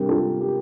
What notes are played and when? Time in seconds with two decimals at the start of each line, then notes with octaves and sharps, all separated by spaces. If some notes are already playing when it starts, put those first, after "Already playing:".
Already playing: C3 G3 D4 G4 A#4
0.09 F4 A4
0.40 G4